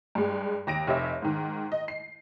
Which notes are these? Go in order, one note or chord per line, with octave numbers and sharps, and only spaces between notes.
G2 G#3
D#2 A#6 D7
F1 G4 C#5 D#5 E5
G#2 D#3
D#5
C7